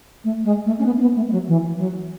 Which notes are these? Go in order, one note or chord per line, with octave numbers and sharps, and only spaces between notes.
A3
G#3
A3
C#4
B3
C#4
B3
A3
G#3
F#3
E3
F#3